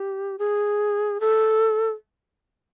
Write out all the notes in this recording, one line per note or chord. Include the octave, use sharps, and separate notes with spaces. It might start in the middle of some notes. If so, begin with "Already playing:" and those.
Already playing: G4
G#4
A4